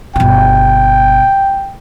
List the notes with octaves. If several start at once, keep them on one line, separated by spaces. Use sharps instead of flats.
G1 B2 G5